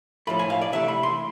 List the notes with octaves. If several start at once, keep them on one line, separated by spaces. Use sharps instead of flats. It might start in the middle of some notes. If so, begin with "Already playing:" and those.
A2 F3 A3 B5
G#5
F5
D5
C3 E3 A3 E5
B5
C6